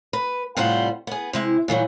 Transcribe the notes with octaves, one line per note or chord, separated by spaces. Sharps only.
B4
A2 C3 G3 F4 C5 F#5
B3 G#4
C3 G#3 E4
A#2 E3 F#3 G3